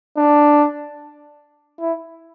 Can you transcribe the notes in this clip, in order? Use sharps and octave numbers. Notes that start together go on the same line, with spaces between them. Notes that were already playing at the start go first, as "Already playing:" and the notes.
D4
E4